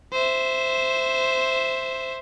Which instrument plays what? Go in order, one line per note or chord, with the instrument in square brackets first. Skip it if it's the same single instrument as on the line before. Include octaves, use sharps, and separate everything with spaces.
[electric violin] C5 E5